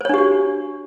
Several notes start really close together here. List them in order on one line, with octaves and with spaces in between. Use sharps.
C5 C#5 D4 G4 F#4